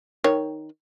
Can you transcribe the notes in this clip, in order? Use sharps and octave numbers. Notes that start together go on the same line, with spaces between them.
D#3 C#5